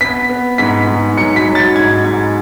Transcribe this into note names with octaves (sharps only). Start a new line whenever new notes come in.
B3 B6
B3
G#2 B6
G#2
F#3 C#7
B6
F#3
A6
G#2 G#6
G#2